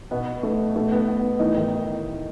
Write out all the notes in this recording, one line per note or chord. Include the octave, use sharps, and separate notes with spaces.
B2 B3
A3
B2 A3
B3
B3
A2 D#3 E3 D#4
D#3 D#4